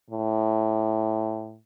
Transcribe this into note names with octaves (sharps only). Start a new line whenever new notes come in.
A2